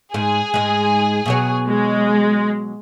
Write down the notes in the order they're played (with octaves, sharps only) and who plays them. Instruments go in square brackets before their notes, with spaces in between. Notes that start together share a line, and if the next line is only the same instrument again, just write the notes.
[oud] G#2 [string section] G#4
[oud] G#2 G#3
B2 F#3 C#5
[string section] G#3